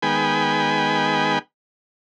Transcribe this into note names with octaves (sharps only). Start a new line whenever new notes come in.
D#3 G#3 B3 G5 G#5 B5